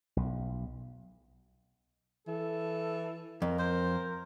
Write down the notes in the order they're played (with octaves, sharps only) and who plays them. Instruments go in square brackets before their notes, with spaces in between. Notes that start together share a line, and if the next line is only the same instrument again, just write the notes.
[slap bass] B1
[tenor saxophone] E3 [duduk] A4
[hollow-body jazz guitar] F2 [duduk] A#4
[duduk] A#4 [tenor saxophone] C5